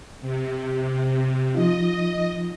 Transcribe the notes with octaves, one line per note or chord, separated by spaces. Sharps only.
C3
F3 D#4 F4 D#5